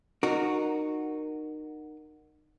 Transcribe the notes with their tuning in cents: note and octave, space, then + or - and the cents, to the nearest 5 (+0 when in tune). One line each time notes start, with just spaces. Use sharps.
D#4 -25 F#4 -5 A#4 +0